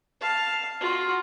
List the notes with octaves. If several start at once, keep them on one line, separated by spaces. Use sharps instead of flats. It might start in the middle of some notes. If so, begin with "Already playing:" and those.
F5 A5
F4 F#4